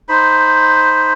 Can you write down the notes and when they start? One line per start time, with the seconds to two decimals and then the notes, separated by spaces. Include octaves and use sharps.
0.09 D#4 C5 B5